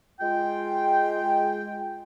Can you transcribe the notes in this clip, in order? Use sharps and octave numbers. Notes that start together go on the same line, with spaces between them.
G#3 F4 G5